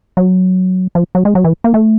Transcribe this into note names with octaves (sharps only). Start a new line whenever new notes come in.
F#3
F3
F#3
G#3
F#3
E3
A#3
A3